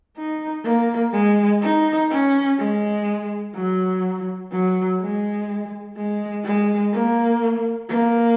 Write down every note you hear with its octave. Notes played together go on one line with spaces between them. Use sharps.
D#4
A#3
G#3
D#4
C#4
G#3
F#3
F#3
G#3
G#3
G#3
A#3
A#3